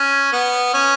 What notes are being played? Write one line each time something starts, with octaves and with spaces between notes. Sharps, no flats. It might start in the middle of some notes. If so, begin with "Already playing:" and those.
Already playing: C#4
B3
C#4